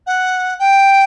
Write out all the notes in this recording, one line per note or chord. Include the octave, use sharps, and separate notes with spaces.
F#5
G5